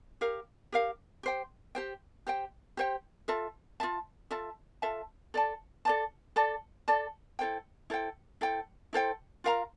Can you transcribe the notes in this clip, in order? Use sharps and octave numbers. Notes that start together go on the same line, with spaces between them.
G4 A#4 F5
G4 A#4 F5
G4 C5 G5
G4 C5 G5
G4 C5 G5
G4 C5 G5
F4 A4 E5 A5
F4 A4 E5 A5
F4 A4 E5 A5
F4 A4 E5 A5
A4 D5 A5
A4 D5 A5
A4 D5 A5
A4 D5 A5
E4 A4 C5 G5
E4 A4 C5 G5
E4 A4 C5 G5
E4 A4 C5 G5
F4 A#4 F5 A#5